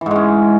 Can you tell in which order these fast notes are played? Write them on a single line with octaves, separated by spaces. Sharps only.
E3 G#2 G#3 C#4